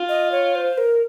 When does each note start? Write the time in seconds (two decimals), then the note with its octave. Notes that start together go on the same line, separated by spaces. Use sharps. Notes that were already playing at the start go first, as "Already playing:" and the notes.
Already playing: F4
0.09 D#5
0.32 C#5
0.55 C5
0.78 A#4